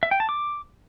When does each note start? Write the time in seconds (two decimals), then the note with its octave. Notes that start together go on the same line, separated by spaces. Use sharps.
0.03 E5
0.11 G5
0.20 A5
0.29 D6